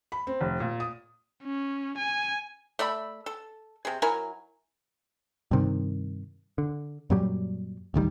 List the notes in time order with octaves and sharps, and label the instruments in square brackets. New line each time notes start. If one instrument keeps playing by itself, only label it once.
[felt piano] B5
C4
F1
A#2
D#6
[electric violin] C#4
G#5
[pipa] A3 D5 E5 B5
A4
C3 G#4
F#3 E4 A#4 G#5
[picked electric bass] G2 C3 D#3
D3
F#2 A#2 F#3 G3
A1 D2 D#3 G3